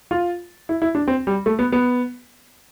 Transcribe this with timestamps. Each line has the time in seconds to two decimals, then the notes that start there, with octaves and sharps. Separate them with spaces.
0.11 F4
0.69 E4
0.82 E4
0.95 D4
1.08 C4
1.27 G3
1.46 A3
1.59 B3
1.72 B3